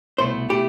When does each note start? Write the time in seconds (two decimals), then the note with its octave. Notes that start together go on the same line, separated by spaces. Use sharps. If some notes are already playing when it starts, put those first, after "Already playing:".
0.18 C2 B2 A3 E4 C5
0.49 B2 A3 E4 G4